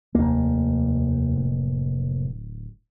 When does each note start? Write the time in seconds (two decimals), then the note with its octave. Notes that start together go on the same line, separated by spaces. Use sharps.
0.15 F1 D#2 A#3
1.37 D1